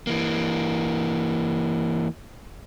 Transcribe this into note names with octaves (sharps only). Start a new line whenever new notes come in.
E3 A#3